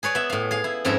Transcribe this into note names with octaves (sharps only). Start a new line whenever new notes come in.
G#4 B4 C#5 D5
B3 E5
A2 F5
G#4 F5
E4
F2 G#2 C#4 E4 A5 A#5